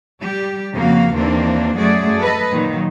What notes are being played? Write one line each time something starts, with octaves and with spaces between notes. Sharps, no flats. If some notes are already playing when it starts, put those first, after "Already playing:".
G3 G4
F2 C#3 A#3 F#4 F5
D#2 E3 A#3 C4 D4
F#2 A3 F#4 G#4 D5
A4 B4 D#5
A#2 D#3 F#3